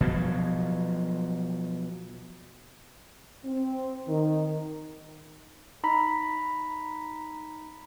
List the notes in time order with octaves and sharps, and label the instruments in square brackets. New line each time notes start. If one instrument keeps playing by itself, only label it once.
[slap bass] B2 F3 F#3
[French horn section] C4
D#3
[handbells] D#4 A#5 B5 B6